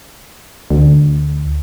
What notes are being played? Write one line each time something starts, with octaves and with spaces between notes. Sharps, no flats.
D2